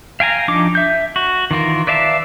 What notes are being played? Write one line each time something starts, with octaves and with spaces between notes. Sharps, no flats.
F5 G5 G#5 A#5
F3 D4 D#4 D6
E5 G6
F#4
D#3 E3 F4 A#4
B4 D5 E5 F5 A5